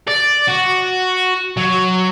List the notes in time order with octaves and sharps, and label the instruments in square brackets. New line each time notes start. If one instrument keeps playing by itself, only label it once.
[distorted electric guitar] D5
F#4
F#3